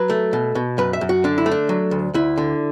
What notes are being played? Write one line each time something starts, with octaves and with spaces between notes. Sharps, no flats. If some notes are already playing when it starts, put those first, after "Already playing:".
Already playing: F#3 B4
A3
B2
B2
F#2 B4
E5
F#2
F#4
D3 D4
E4
A3
D4
F#3
D2
D2 E4
D3